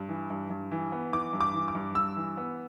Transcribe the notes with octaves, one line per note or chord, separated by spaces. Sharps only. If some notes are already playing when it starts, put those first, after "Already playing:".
Already playing: G2
E3
G2
G2
E3
B3
E3 D6
G2
D6
E3
D6
G2
G2 E6
E3
B3